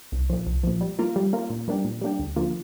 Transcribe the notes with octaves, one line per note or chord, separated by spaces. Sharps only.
C2
A#2 F3
C2
A#2 F3
G3
A#3 F4 A#4
G3
A#3 F4 A#4
A#2
G3 A#3 D4 G4
A#2
G3 A#3 D4 G4
D2
D3 F3 A#3 F4